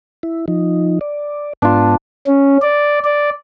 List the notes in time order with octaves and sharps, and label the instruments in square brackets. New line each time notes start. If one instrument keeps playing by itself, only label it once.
[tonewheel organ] E4
F3 D#4
D5
[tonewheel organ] G#2 B3 [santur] D4 F4
[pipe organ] C#4
D5
D5